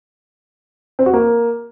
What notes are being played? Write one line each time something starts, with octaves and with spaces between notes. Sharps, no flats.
C4
F#4
A#3